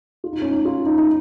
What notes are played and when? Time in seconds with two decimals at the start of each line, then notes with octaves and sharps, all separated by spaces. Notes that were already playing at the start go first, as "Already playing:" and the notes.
0.24 F4
0.33 D#4
0.42 C#4
0.51 D#4
0.65 F4
0.86 D#4
0.98 D#4